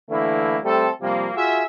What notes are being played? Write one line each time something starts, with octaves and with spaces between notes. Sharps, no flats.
D3 E3 A3 A#3 E4
G3 A3 C4 A4
C3 F3 G3 A#3
F4 F#4 G#4 E5